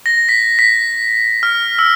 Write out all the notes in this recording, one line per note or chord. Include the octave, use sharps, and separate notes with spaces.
A#6
B6
B6
F6
E6